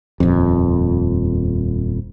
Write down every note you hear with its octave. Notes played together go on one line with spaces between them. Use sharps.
D#1 F2